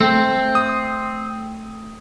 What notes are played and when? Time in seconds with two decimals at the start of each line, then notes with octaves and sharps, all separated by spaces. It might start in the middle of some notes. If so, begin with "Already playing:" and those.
0.01 A3 C4
0.55 D#6